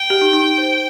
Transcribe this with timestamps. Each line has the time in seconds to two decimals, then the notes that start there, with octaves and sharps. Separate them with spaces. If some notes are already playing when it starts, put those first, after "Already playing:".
Already playing: G5
0.10 G4
0.21 D#4
0.33 D#4
0.58 C5